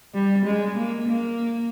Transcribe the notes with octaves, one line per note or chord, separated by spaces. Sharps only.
G3
G#3
A#3
A#3